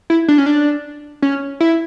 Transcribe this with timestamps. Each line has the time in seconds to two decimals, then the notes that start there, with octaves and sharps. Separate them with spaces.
0.10 E4
0.28 D4
0.38 C#4
0.46 D4
1.22 C#4
1.60 E4